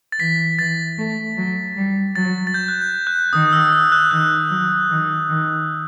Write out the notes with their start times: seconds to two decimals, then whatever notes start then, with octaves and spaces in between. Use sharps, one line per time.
0.12 A6
0.19 E3 B6
0.59 E3 A6
0.98 A3
1.37 F#3
1.77 G3
2.16 F#3 A6
2.47 A6
2.54 G6
2.68 F#6
2.81 G6
3.07 F#6
3.33 D#3 D#6
3.53 E6
3.73 E6
3.92 F#6
4.11 D#3 F#6
4.51 F#3
4.90 D#3
5.29 D#3